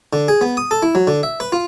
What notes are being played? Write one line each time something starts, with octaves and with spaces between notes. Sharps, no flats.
D3
G#4
B3
D#6
A4
E4
F#3
D3
E5
B4
F4